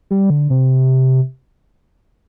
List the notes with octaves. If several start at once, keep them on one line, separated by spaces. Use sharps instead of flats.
G3
D3
C3